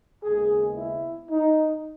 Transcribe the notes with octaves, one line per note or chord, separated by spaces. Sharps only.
D#2 C#3 G#3 B3 G#4
E4
D#4